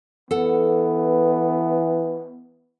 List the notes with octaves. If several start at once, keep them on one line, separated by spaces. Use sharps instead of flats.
E3 B3 A4 F#5